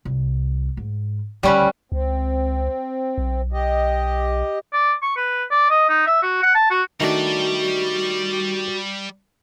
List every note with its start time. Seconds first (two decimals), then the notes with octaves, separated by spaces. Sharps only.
0.05 C2
0.77 G#2
1.43 D2 C#3 G3 C#4 B4
1.92 C#2 C4
3.18 B1
3.52 G4 D#5
4.73 D5
5.02 C#6
5.16 B4
5.51 D5
5.70 D#5
5.89 D#4
6.06 E5
6.22 F#4
6.43 F#5
6.55 A5
6.70 F#4
7.00 D#3 G3 A3 D4 F#4 D5